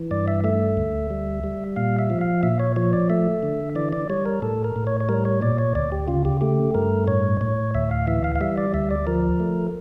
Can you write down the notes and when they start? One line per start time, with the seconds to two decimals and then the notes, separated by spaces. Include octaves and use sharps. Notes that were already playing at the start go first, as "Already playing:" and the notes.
Already playing: E3
0.11 G2 D5
0.28 E5
0.44 A3 E5
0.77 D2
1.10 G3
1.44 G3
1.76 A#2 F5
1.99 E5
2.10 F3
2.21 F5
2.43 A#2 E5
2.60 C#5
2.76 F3 C#5
2.93 D5
3.10 A3 E5
3.42 D3
3.75 E3 D5
3.93 D5
4.09 G3 C#5
4.26 A#4
4.42 A2 A4
4.64 A#4
4.76 A2
4.87 C#5
5.00 C#5
5.09 G3 A#4
5.25 C#5
5.41 A#2 D5
5.58 C#5
5.75 D2 D5
5.92 G4
6.08 C#3 F4
6.25 G4
6.41 A3 G4
6.74 G2 A#4
7.07 A2 C#5
7.41 A2 C#5
7.75 D2 E5
7.91 F5
8.07 E3 E5
8.24 F5
8.36 F5
8.41 G3 E5
8.58 D5
8.74 D2 E5
8.91 D5
9.07 F3 A#4
9.40 A3